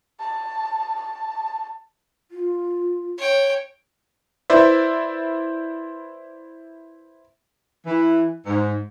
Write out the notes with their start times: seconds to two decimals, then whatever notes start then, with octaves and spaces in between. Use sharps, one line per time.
0.20 A5
1.01 A5
2.31 F4
3.18 C#5 G5
4.50 E4 B4 C5 D5 E5
7.86 E3
8.46 G#2